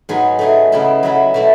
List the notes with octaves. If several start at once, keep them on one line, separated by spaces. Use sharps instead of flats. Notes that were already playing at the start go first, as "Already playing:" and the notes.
G#2 F#3 B3 D#4 G#4
F#3 A3 D#4 G#4
C#3 G#3 B3 E4 A4
F#3 B3 E4 A4
B2 A3 E4